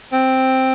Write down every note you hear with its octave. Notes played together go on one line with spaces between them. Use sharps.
C4